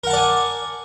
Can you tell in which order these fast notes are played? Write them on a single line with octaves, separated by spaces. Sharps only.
A#4 F#5 A5 D5 G#5